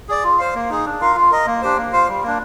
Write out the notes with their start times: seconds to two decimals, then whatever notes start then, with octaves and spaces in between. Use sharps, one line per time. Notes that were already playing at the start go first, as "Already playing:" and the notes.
0.09 G#4 D5
0.24 F4
0.39 C5 F5
0.55 A#3
0.70 D#4 G#4
0.86 D4
1.01 F4 A#4 F5
1.16 F4
1.31 A#4 D#5
1.46 A#3
1.62 D4 G4 C5
1.77 A#3
1.92 F4 C5 F5
2.08 G3
2.23 A#3 D4